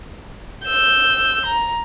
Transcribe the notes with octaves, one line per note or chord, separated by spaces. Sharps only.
E6 G6
A#5